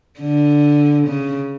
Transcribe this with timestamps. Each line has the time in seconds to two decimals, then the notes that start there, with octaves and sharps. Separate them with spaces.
0.20 D3
1.07 C#3